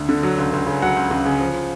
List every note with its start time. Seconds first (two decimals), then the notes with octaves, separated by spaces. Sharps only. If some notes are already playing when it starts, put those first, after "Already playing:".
Already playing: D2
0.09 D3
0.23 F#3
0.38 C#2
0.53 C#2
0.67 C#3
0.82 F#3 F#5
0.96 C#2
1.11 C#2
1.25 C#3
1.40 F3